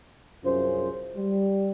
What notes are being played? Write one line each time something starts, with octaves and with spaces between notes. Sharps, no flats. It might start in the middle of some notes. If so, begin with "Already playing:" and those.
C2 F#2 C#4 F4 G#4 C5
G3